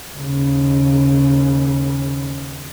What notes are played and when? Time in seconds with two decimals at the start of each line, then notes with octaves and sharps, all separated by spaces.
0.13 D#2 C#3